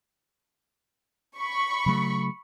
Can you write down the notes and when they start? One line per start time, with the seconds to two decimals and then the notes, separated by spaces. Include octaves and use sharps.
1.38 B5 C#6
1.86 C#3 F#3 A3